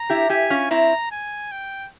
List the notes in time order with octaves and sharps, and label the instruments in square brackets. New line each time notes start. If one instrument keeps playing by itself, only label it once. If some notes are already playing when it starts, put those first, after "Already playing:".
Already playing: [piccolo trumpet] A#5
[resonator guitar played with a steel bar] E4 G4
[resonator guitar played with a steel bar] E4 G4 [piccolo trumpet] G#5
[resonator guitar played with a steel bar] C#4 F4
[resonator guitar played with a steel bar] C4 E4 [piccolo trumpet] A#5
[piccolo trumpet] G#5
G5